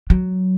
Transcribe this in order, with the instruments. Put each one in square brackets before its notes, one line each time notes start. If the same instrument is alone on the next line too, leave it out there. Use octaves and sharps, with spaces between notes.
[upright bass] F#3